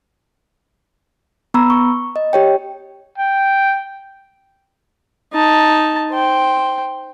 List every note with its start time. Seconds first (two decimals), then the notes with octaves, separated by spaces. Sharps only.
1.54 B3 A#5 B5 E6
1.70 C#6
2.16 D#5
2.33 G4 C#5 G5
3.18 G5
5.33 D#4 A5
6.11 C5 G5